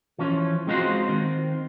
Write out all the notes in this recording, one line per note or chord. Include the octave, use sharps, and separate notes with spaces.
E3 F3 C#4
G#3 C4 D#4 F4 F#4 C5
D#3 C4